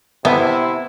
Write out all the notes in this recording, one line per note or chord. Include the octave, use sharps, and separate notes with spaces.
C3 B3 E4 A4 E5 G#5